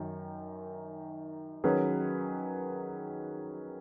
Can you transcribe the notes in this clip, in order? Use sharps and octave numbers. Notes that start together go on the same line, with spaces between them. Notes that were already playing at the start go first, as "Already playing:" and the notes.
Already playing: F#2 D#3
D#3 F#3 C#4 G#4 B4